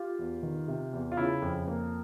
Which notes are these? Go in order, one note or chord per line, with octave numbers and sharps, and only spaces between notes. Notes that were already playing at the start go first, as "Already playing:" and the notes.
Already playing: F4 G4
E2
D#3
C3
E2
F4
C#3 E4
F2
A#3